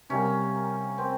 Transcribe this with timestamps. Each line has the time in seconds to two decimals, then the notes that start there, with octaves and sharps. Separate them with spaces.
0.10 C3 G3 A#3 C#4
0.98 C4